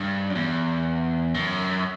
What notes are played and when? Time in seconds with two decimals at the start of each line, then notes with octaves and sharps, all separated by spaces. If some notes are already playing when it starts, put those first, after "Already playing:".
Already playing: G2
0.30 F#2
0.35 E2
1.34 F#2